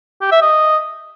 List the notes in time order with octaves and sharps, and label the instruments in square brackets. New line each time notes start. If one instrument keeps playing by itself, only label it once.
[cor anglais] G4
E5
D#5